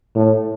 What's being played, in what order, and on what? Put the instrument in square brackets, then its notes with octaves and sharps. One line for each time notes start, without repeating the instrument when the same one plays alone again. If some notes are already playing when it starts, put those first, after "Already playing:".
[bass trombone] A2